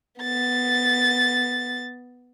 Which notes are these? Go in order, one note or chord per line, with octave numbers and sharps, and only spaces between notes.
B3 A6